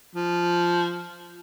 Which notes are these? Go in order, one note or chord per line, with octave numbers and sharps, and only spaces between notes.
F3